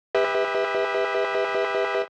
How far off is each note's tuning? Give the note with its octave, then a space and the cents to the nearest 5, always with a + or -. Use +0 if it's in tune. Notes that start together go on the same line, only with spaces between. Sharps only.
G4 +35 B4 +0 E5 -25